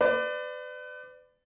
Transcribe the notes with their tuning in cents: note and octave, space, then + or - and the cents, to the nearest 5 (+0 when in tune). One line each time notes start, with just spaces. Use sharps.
B4 +35 D5 +15